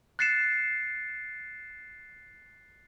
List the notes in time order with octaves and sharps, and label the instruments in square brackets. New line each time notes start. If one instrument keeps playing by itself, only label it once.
[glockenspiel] F#6 A6 C7 C#7 E7